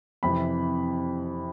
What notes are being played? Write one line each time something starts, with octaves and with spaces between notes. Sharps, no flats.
F2 C3 E3 B5